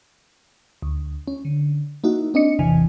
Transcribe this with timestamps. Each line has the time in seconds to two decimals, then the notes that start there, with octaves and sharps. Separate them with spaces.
0.82 D2
1.28 C#4
1.45 D3
2.04 A#3 D#4 E4 F#4
2.34 C4 D4 D#5 C#7
2.59 G#1 E2 C3 E3 G#5